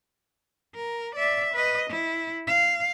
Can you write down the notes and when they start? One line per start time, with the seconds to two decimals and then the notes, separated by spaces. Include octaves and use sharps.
0.76 A#4
1.15 D5 E5
1.54 B4 D#5
1.90 E4
2.47 F5